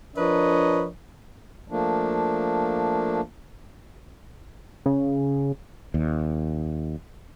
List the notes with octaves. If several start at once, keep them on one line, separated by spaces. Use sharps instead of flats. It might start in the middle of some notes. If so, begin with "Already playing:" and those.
F3 D4 A#4 B4 C#5 D#5
F3 A3 A#3 D4
C#3
D#2